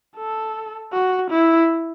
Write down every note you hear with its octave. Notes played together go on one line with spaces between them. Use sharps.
A4
F#4
E4